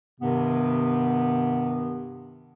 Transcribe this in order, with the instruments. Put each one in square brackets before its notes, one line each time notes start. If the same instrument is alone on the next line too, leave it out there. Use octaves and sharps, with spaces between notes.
[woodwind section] G2 C3 D#3 B3